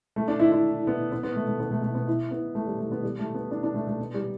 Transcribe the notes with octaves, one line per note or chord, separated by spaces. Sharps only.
A3
D4
E4
E4
B3
B3
B3
A3
A3
B3
A3
A3
B3
E4
B3
A3
G3
A3
B3
G3
A3
B3
D4
D4
A3
A3
B3
G3